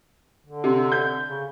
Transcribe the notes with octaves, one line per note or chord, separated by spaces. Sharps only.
D3
C3
G6
C#3